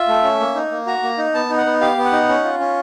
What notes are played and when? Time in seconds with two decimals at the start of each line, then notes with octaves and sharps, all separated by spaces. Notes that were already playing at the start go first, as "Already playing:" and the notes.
Already playing: F4 E5
0.08 A3
0.24 C#4
0.40 A#3
0.55 D#4
0.71 A#3
0.87 F#4 A#5
1.03 A#3
1.18 D#4
1.34 B3 A5
1.50 D#4
1.57 F#5
1.66 B3
1.81 G4 F5
1.97 B3
2.05 F#5
2.12 D#4
2.29 C#4
2.44 F4
2.59 C#4